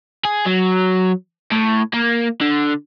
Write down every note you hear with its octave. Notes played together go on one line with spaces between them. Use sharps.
G#4
F#3
A2
A#3
D3